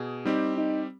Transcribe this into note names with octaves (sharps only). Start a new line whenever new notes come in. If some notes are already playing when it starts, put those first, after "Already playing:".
Already playing: B2 G#4
G3 C4 D#4 G4
D#4